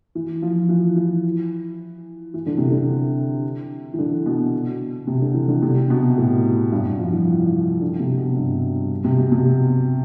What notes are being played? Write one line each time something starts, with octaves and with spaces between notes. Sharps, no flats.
E3
F3
E3
E3
E3
D3
C3
D3
E3
D3
B2
C3
D3
E3
D3
C3
B2
A2
G2
G2
F3
E3
E3
D3
C3
B2
G2
C3
B2
C3